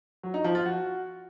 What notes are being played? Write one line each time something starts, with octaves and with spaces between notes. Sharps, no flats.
F#3
D#4
F3
F4
F#4